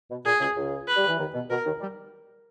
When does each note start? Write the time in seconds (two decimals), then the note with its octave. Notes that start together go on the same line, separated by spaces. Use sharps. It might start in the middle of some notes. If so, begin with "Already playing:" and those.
0.10 B2
0.25 A#2 G#4
0.40 C#2 C#3
0.56 C#2 C#3
0.88 B4
0.96 G3
1.07 E3
1.18 D#2 D#3
1.34 B2
1.50 B2 A#4
1.65 D#2 D#3
1.80 G3